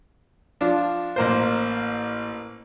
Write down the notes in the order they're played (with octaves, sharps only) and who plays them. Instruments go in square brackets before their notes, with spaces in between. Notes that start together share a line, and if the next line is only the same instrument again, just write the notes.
[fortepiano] F3 D4 F4
A1 A#3 C5